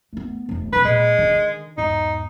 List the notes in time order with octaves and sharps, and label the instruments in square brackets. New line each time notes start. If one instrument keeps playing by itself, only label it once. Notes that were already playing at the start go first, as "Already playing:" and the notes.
[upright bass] A3 B3
F1 E2
[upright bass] B1 E3 [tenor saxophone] B4
[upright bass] A#2 [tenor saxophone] G#3
[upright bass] D3 D#3
[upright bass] E2 G#2 [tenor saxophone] D#4